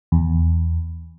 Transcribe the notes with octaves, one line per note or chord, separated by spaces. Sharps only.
E2